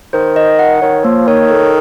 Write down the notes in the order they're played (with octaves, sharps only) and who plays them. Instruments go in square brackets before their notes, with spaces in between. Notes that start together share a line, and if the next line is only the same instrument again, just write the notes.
[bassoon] D#3 [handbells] C5
[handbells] D#5
F#5
[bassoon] D#3 [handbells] C#5
[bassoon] F3 [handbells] A#3
[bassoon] D#3 [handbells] C#5
[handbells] A4